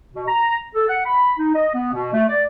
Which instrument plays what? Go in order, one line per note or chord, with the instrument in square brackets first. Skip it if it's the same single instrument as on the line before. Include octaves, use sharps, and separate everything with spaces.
[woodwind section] B2
A#5
A4
F#5
B5
D#4
D#5
B3
B2
A3
D5